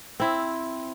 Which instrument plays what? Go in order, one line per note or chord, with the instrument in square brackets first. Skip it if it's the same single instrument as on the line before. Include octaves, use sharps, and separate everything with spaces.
[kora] C4 E4